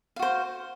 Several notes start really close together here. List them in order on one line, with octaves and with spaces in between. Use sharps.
F5 F#4 C5